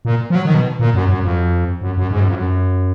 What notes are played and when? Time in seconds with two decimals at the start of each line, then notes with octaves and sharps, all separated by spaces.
0.05 A#2
0.30 F3
0.35 F#3
0.45 D#3
0.54 B2
0.80 A#2
0.94 F#2
1.09 F#2
1.23 F2
1.81 F#2
1.97 F#2
2.11 G#2
2.20 F#2
2.28 F2
2.35 F#2